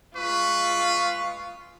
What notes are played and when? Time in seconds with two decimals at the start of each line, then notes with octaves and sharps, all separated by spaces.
0.16 G#3 F4 B4 C#6